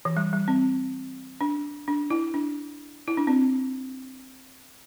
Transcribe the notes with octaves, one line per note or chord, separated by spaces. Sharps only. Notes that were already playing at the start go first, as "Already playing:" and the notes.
E3
G3
G3
C4
D4
D4
E4
D4
E4
D4
C4